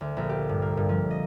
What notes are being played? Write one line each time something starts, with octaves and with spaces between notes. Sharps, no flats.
D2
A#1
G4
G2
A#3
G2
F3
D#5